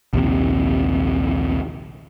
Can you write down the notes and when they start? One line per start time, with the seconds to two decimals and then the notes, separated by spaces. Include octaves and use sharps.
0.13 A#1 D#2 C3